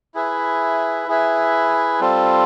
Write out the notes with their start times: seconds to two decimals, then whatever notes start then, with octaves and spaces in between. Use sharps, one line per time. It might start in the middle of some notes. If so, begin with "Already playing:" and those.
0.14 E4 G#4 B4 E5
1.07 E4 G#4 B4 E5
2.00 G3 C4 F4 A4